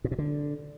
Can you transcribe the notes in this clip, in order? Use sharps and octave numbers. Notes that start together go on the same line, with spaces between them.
A#2
B2
D3